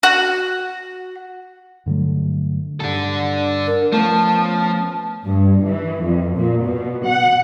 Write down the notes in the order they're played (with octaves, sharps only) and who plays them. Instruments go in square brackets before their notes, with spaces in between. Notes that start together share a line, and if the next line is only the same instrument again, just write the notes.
[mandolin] F#4
[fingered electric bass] G2 D3 F#3 A3
[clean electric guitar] B1 G2 [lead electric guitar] D4 A4
[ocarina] A#4
[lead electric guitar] F3 [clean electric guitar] A3 B3 C#4 [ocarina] A5
[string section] G2
E3
F2
A#2
B2
F#5